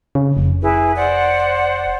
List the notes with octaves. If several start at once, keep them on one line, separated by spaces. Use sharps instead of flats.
C#3
F1
E4 G#4 B4
C5 D5 F#5